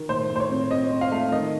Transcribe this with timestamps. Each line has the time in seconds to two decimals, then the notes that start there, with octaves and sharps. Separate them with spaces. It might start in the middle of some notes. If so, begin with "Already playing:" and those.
Already playing: D#3
0.09 A2 C5
0.30 A2
0.36 C5
0.40 C#5
0.50 C4
0.70 C4 D#5
0.91 C4
1.01 F5
1.12 A3
1.32 D#3 D#5